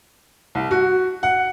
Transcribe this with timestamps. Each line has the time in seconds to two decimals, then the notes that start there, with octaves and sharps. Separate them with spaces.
0.55 C2
0.71 F#4
1.23 F#5